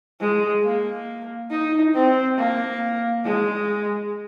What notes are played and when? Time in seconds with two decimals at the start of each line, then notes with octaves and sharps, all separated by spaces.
0.20 G#3
0.64 A#3
1.50 D#4
1.94 C4
2.37 A#3
3.24 G#3